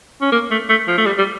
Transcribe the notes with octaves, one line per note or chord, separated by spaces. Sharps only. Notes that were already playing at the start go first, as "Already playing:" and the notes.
C#4
A#3
A3
A3
F3
A3
G3
G3